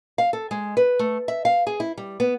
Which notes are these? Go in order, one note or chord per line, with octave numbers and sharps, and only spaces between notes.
F5
A4
G#3
B4
A3
E5
F5
G#4
E4
G3
B3